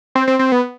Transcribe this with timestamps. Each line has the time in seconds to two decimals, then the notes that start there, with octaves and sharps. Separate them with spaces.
0.15 C4
0.27 C4
0.39 C4
0.52 B3